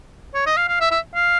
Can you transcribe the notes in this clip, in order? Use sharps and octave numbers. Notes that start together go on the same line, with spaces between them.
C#5
D#5
F5
F5
E5
E5
F5